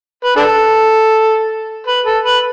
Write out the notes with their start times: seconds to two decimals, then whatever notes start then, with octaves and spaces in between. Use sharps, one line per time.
0.25 B4
0.36 D4 A4
1.87 B4
2.06 A4
2.24 B4